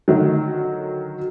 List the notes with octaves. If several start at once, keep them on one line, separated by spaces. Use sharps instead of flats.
D3 D#3 F#3